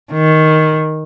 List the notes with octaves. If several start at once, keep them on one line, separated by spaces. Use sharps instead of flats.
D#3